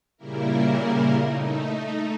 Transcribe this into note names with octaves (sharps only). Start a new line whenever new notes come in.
A#2 C#3 G3 A#3 E4 A#4
A3 D#4